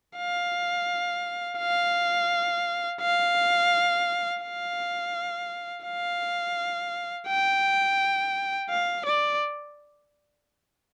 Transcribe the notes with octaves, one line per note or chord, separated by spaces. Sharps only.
F5
F5
F5
F5
F5
G5
F5
D5